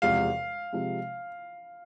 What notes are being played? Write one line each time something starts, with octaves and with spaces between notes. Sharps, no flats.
E1 E2 C3 F3 G#3 F5
C3 F3 G#3